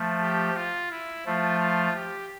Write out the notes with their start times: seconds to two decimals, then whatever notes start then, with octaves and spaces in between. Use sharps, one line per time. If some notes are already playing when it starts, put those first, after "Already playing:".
Already playing: F3 A3
0.22 G4
0.56 F4
0.91 E4
1.26 F3 A3 F4
1.60 F4
1.95 G4